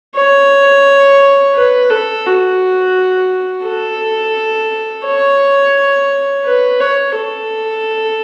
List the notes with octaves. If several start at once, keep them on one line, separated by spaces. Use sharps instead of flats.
C#5
B4
A4
F#4
A4
C#5
B4
C#5
A4